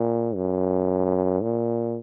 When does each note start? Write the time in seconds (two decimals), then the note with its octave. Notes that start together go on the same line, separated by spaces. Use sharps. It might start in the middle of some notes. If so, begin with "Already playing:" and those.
Already playing: A#2
0.35 F#2
1.42 A#2